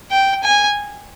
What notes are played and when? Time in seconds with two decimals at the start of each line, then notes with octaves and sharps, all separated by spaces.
0.11 G5
0.44 G#5